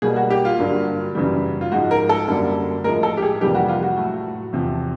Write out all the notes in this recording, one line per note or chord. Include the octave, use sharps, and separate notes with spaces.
B2 G3 A#3 G#4
F#4
G4
F4
G2 D3 F#3 A#3
F#2 C#3 E3 G3
F4
G#2 F3 G#3 F#4
A#4
A4
F#2 D3 G3 A#3
A2 F3 G#3 A#4
A4
G4
G#4
F2 C3 E3 G3 A#3 G4
F#4
F4
F#4
A2 F#3 A3
E2 C3 F3